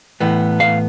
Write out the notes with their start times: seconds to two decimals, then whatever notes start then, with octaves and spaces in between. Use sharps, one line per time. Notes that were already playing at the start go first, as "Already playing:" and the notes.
0.21 A2 E3 B3
0.60 F5